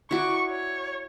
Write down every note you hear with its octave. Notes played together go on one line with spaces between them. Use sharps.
E4 F#4 D5 C#6
C#5